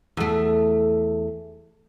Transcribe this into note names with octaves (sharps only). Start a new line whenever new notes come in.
E2 A3